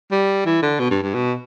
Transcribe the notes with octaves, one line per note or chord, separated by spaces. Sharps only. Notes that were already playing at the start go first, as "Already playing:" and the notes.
G3
E3
D3
B2
G2
G2
B2